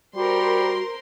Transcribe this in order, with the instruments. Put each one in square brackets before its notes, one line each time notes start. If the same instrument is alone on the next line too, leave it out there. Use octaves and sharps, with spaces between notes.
[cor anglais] G3 [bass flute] F#4 [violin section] A#4 C5 C6